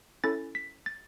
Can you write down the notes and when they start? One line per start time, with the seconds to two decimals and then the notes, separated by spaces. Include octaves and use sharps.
0.24 C#4 E4 A4 A6
0.55 B6
0.86 A6